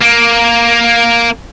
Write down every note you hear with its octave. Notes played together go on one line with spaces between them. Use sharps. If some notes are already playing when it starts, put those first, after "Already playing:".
A#3